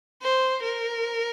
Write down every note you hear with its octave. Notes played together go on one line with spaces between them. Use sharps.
C5
A#4